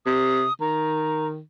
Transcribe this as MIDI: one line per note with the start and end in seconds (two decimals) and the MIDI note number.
0.06 0.45 48
0.06 0.53 87
0.60 1.40 51
0.60 1.27 82